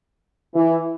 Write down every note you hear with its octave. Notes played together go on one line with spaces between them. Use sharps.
E3